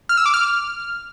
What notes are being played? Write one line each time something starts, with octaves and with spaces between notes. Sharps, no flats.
F6
E6
D6
F6